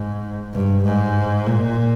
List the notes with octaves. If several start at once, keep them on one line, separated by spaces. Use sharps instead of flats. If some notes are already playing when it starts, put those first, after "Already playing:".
Already playing: G#2
G2
G#2
A#2